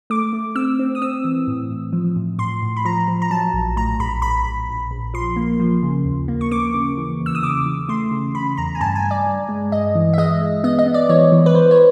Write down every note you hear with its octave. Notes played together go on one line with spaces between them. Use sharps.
A3 D6
A3
C4 E6
C4
D#6
C4 E6
E3
A2
A2
F3
A2
A2 C6
A2
B5
F3 A#5
F3
A#5
F#3 A5
A#1
A2 A#5
A#1 B5
A#1 B5
A#1
A#1
A#1
F3 C6
A#3
F3
C#3
D#2
A#3
C#6
A#3 D6
C#3
E3
E2
E6
D#6
C#3 D6
E3
A3 C6
C#3
C#3 B5
E2 A#5
G#5
G2 A5
G#5
G2
D5
G2
G#3
G2 D#5
E3
E5
G#3 D#5
G#3
B3 D#5
D#5
B3
D5
E3 C#5
E3
B4
E3 C5
C#5